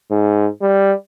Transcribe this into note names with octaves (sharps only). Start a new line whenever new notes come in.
G#2
G3